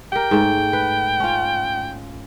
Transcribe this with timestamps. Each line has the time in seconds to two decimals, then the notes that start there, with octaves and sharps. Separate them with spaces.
0.13 G4 A#4 G5
0.31 G#2 A3
0.73 B4
1.20 C#4 F4